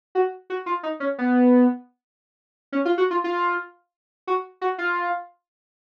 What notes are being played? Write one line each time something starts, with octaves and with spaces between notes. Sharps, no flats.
F#4
F#4
F4
D#4
C#4
B3
C#4
F4
F#4
F4
F4
F#4
F#4
F4